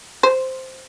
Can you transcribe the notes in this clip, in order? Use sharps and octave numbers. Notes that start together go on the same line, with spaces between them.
C5